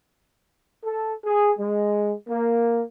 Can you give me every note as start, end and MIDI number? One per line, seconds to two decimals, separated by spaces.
0.83 1.13 69
1.25 1.51 68
1.58 2.12 56
2.28 2.81 58